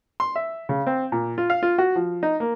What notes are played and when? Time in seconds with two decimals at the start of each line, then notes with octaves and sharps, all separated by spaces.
0.20 C6
0.36 E5
0.69 C#3
0.87 C4
1.12 A#2
1.38 F4
1.50 F5
1.63 F4
1.78 F#4
1.96 F3
2.23 D#4
2.40 A#3